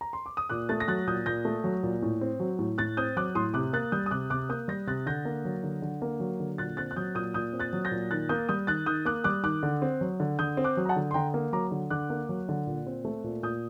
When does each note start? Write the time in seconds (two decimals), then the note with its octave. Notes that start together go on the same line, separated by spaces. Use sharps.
0.01 A#5
0.13 C6
0.26 D6
0.37 D#6
0.49 A#2 D6 F#6
0.69 A3 F#6 A6
0.80 A#6
0.88 F#3 F#6 A6
1.07 A#2 D#6 G6
1.26 A#2 G6 A#6
1.45 A3
1.64 F#3
1.83 A#2
2.02 A2
2.21 C4
2.40 F#3
2.59 A2
2.78 A2 F#6 A6
2.97 C4 D#6 G6
3.16 F#3 D6 F#6
3.35 A2 C6 D#6
3.54 C3 D6 F#6
3.73 A#3 F#6 A6
3.92 G3 D#6 G6
4.06 D#6
4.11 C3 D6 F#6
4.30 C3 D6 F#6
4.49 A#3 D#6 G6
4.68 G3 G6 A#6
4.87 C3 F#6 A6
5.06 D3 G6 A#6
5.25 A#3
5.45 F#3
5.64 D3
5.82 D3
6.02 A#3
6.20 F#3
6.40 D3
6.58 A#2 F#6 A6
6.77 C4 F#6 A6
6.91 F#6
6.96 F#3 D#6 G6
7.15 A#2 D#6 G6
7.34 A#2 D#6 G6
7.53 C4
7.59 F#6 A6
7.73 F#3
7.85 G6 A#6
7.91 A#2
8.11 D#3 F#6 A6
8.29 A#3 D#6 G6
8.49 G3 D#6 G6
8.67 D#3 F#6 A6
8.86 D#3 D#6 G6
9.05 A#3 D6 F#6
9.24 G3 D6 F#6
9.43 D#3 D6 F#6
9.63 D3
9.82 C4
10.01 F#3
10.20 D3
10.39 D3 D#6 G6
10.57 C4
10.64 D6 F#6
10.77 F#3
10.85 A#5
10.89 F#5 A5
10.96 D3
11.11 C6
11.14 D3 G5 A#5
11.34 A#3
11.53 F#3 A#5 D6
11.71 D3
11.90 D3 D6 F#6
12.10 A#3
12.29 F#3
12.49 D3
12.67 A#2
12.86 C4
13.05 A3
13.24 A#2
13.43 A#2 D#6 G6